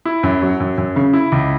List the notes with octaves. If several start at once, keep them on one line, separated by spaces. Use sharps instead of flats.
E4
F#2
F#3
F#2
F#2
C#3
E4
C#2